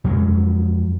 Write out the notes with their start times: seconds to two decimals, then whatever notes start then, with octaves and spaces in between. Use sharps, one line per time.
0.04 F2 F#3 G#3